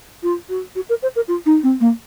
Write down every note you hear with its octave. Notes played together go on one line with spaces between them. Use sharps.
F4
F#4
F#4
A#4
C5
A#4
F4
D#4
C4
A#3